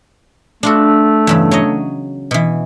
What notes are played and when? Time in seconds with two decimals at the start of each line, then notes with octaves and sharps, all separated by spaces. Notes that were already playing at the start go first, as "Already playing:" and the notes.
0.63 A3 D4 F4 F#4
1.27 E2 G2 C#3
1.51 F#3 C#5 D#5
2.31 B2 E3